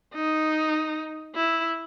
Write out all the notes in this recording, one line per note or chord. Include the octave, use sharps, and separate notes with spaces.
D#4
E4